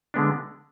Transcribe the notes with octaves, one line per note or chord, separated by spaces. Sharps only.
D3 G#3 B3 D4